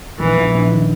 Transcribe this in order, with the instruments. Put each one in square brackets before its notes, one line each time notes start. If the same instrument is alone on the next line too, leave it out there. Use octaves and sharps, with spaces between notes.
[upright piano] A#1 [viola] E3
[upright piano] A#1
A#1
D#3